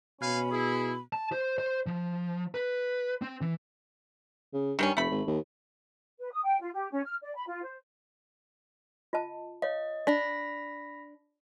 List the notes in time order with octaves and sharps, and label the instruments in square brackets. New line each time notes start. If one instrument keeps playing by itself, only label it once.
[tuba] B2 [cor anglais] C#4 [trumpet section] F5 G#5 [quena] B5
[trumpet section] E4 [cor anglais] G#4
[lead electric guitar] A5
C5
C5
F3
B4
C4
E3
[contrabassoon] C#3
[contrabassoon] G2 [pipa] D#3 G3 C#4
[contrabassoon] F1 [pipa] A3 B5
[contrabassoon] G#1
D#2
[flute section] B4
D#6
G5
F4
G4
C#4
F6
D5
B5
F4
C5
[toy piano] F4 D#5 A5
[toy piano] C#5 F5 [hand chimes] D#5
[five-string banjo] D4 [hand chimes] B5 A#6 B6